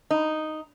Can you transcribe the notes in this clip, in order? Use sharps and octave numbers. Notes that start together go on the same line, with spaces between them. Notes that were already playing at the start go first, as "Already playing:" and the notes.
D#4